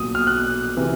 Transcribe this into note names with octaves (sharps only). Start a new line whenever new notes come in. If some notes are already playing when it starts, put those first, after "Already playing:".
Already playing: B1 A#2 F#3 D#6
F6
F#6
C3 E3